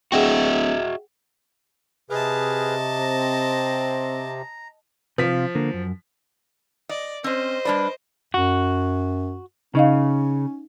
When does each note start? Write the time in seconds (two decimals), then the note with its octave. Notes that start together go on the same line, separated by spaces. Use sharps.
0.12 D1 F#4 G#4 D#5 E5 F#5 G5
2.10 C3 G#4 B4 D#5 A5 F6
3.00 C4 A#5
5.18 C3 F3 F4 B6
5.55 D3 A#3
5.73 F#2
6.89 D5 D#5
7.24 C4 C#4 C5 D#5
7.65 G3 D4 B4 D5
8.34 F#2 F#4
9.75 C#3 C#4 D#4 D#5 F5